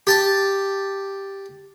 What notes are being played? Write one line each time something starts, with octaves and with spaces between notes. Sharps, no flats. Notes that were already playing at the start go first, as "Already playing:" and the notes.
G4 A5